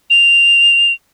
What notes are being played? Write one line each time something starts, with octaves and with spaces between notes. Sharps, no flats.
F7